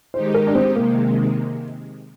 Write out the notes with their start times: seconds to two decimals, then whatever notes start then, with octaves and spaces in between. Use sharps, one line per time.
0.14 D#3 G#3 D#4 G4 C5
0.34 A#4
0.47 D4
0.55 C4
0.76 C3 D#3 G#3 A#3